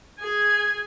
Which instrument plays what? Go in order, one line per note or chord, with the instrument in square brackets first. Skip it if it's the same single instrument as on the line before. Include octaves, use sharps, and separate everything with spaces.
[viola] G#4 G#5